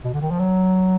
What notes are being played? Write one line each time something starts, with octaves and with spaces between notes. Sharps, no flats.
B2
D3
D#3
F3
F#3